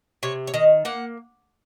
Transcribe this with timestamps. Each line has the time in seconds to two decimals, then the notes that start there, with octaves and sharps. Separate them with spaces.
0.23 C3 C#5
0.47 C#5
0.54 D#3 D#5
0.85 A#3 F#5